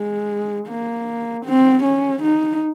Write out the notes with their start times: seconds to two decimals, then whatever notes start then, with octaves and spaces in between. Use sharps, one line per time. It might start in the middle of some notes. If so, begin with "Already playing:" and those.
Already playing: G#3
0.67 A#3
1.46 C4
1.84 C#4
2.23 D#4